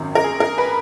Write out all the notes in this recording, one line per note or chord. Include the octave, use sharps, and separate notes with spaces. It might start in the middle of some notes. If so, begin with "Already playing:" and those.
Already playing: G#1 F#2 D#3
A#4
G#4
A#4
B4